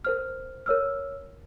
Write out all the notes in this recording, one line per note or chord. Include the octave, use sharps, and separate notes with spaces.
A#4 C5 F6
A#4 C#5 E6 F6